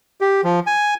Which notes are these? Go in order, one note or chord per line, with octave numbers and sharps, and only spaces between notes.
G4
F3
G#5